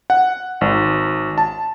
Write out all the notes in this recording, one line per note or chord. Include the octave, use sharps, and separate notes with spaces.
F#5
G#1
A5